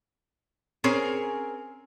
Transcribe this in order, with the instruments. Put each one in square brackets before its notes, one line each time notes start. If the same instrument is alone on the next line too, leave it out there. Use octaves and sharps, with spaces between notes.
[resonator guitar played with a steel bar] C4 C#4 G#4 A#4